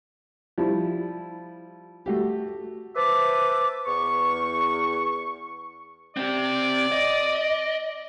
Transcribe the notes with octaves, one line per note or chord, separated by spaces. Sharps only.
F3 G3 E4
A3 F#4 G4
B4 C5 E5 A5 D6
E2 C#6
C4 G4 D5
D#5